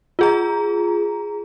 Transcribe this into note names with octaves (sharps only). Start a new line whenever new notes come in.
F4 G#4 A#5